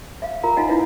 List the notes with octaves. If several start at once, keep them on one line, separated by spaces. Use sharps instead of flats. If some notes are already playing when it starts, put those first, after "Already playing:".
E5 F5
F4 A#4 A#5
D#4 F4 D#5 F5 F#5 G#5
D4 E4 F4 B4